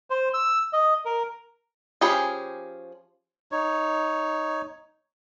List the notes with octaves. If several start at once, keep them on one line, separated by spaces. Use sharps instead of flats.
C5
E6
D#5
A#4
F3 C#4 G4 G#4 B5
D#4 C#5